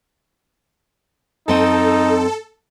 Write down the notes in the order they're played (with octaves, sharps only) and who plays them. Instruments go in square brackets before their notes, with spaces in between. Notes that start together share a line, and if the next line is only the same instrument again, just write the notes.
[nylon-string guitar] F#2 C4 D#5 [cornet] D#4 [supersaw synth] A4